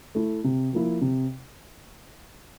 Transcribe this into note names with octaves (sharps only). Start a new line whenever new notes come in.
A3 E4
C3
F3 A#3 E4
C3